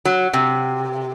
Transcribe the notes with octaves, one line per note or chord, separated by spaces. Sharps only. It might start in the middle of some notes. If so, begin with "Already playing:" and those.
F#3
C3